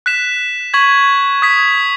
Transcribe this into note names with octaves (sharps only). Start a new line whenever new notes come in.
F#6 B6 E7
C#6 G#6 B6 F#7
D#6 G#6 B6